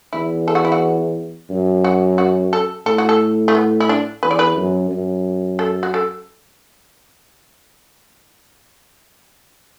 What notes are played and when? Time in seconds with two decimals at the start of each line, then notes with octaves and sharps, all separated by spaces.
0.13 E2 E4
0.48 A4
0.55 F#4
0.65 E4
0.72 F#4
1.50 F#2
1.84 F#4
2.18 F#4
2.53 A4
2.86 A2 A4
2.98 F#4
3.09 A4
3.48 A3
3.55 B3
3.80 E4
3.89 D4
4.23 E2 B4
4.31 D5
4.39 B4
4.57 F#2
4.91 F#2
5.59 A4
5.83 F#4
5.94 A4